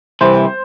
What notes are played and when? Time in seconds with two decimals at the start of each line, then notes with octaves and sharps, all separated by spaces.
0.21 C2 C3 E3 C5